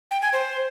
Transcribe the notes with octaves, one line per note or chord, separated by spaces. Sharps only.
G5
G#5
C5